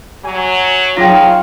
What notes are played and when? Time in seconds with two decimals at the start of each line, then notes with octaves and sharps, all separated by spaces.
0.25 F#3 G#5
0.97 C#3 F#3 D#4 F4 F5 G5